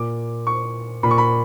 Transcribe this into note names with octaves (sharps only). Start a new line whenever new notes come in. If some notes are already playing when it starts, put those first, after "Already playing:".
Already playing: A#2 D6
C#6
A#2 B5
C#6
B5